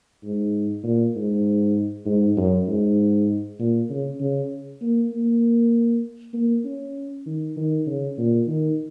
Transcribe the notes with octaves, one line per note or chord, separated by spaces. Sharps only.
G#2
A#2
G#2
G#2
F#2
G#2
A#2
C#3
C#3
A#3
A#3
A#3
C#4
D#3
D#3
C#3
A#2
D#3